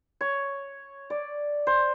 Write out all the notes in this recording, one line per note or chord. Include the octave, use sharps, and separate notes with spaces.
C#5
D5
C5